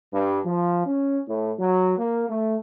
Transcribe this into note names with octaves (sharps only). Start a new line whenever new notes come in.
G2
F3
C#4
A2
F#3
A#3
A3